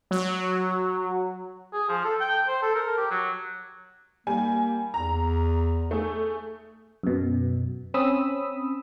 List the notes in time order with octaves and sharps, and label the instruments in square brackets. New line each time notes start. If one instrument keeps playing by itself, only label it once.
[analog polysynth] F#3
[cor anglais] G#4
F3
A4
G5
C5
A4
A#4
G4
F#3
[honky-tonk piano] G3 G#5 [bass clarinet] A#3
[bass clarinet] E2 [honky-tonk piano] A#5
[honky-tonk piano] A3 G#4
[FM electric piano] F#2 B2
C4 C#4 B5 D#6 E6